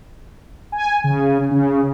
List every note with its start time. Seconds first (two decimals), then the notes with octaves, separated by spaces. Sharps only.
0.72 G#5
1.04 C#3
1.51 C#3